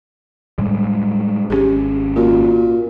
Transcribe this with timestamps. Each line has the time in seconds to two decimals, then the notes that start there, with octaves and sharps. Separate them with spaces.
0.58 A2 G3 G#3
1.50 G#1 D3 C#4 G4 G#4
2.16 A#2 F#4